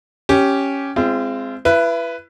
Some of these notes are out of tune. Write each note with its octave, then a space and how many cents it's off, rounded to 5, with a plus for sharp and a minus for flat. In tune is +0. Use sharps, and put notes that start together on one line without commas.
C#4 +0 G4 -10
G#3 +0 C4 -5 F4 -40
E4 +30 B4 +0